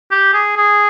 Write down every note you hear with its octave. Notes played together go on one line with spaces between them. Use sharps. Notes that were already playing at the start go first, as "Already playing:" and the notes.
G4
G#4
G#4